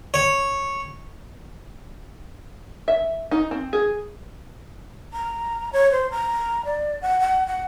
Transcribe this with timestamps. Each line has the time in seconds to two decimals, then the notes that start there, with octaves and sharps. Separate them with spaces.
0.14 C#5
2.88 E5
3.31 D#4
3.51 C4
3.73 G#4
5.13 A#5
5.73 C#5
5.91 C5
6.11 A#5
6.65 D5
7.02 F#5
7.20 F#5
7.47 F#5